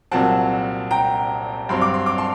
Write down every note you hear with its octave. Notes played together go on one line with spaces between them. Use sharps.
C2 A#2 F#3 C4 F#5 A5
G5 A#5
G2 F#3 C4 C6
D6
C6
D6
A5 C6